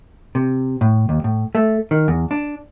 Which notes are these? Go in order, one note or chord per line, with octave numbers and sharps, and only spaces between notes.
C3
A2
D#2
A2
A3
D#3
E2
D4